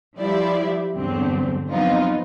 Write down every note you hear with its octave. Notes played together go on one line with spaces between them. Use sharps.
F3 G3 E4 G4 D5 E5
E2 G2 D3 F#3 C4
F3 F#3 B3 C4 D#4 F4